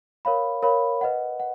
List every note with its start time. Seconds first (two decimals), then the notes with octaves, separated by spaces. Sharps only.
0.25 A#4 C#5 F5 B5
0.63 A#4 C#5 F5 B5
1.01 B4 D#5 F#5
1.40 F#5